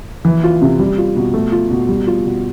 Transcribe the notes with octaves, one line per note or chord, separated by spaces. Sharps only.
E3
F4
C3
G3
F4
B2
A3
F4
B2
G3
F4
B2